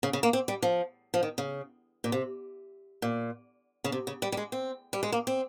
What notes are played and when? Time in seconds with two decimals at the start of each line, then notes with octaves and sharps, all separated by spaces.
0.03 C#3
0.13 C#3
0.23 A#3
0.33 C4
0.48 G3
0.62 F3
1.14 F3
1.23 D#3
1.38 C#3
2.04 A#2
2.12 C3
3.02 A#2
3.84 C#3
3.92 C3
4.07 C#3
4.22 G3
4.32 G3
4.37 G#3
4.52 C4
4.93 G3
5.03 G#3
5.12 A#3
5.27 C4